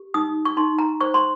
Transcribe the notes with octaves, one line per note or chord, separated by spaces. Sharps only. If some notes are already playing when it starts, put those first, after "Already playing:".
Already playing: G4
D#4 D#6
C#6
D#4 C6
A#5
C5 C#6
C6